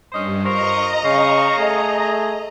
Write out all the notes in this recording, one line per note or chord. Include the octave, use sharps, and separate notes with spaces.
G2 C#4 C5 D#5
F4 A#4 C5 D#5 A#5 C#6
C#3 C5 F5 C#6
A3 G#4